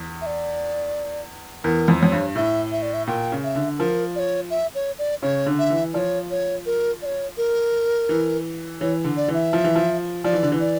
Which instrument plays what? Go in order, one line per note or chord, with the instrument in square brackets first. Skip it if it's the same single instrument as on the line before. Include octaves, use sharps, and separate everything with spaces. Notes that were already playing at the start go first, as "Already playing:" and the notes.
Already playing: [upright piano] E2
[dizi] E5
D5
[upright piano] E2 [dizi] A#4
[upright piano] F2
[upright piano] F2 [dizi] C#5
[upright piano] G2
[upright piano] A2 [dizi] E5
[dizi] E5
D5
E5
[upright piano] A#2 [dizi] G5
[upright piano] C#3
[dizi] E5
[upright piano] D3
[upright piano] F3 [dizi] A#4
[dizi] D5
C#5
E5
C#5
D5
[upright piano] C#3 [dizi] C#5
[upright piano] D3
[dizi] E5
[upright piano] E3
[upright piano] F3 [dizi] C#5 D5
[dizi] C#5
A#4
D5
C#5
A#4
[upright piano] E3
[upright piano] E3 [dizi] C#5
[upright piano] D3
[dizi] D5
[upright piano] E3
[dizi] E5
[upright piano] F3
E3
F3
[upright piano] F3 [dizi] D5
[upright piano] E3
D3
E3
[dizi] D5